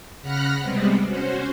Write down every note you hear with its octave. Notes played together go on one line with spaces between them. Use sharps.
C#3 F#5 B5 F6 F#6 A#6
C3 G3 G#3 B3 C4
C#4 F#4 C5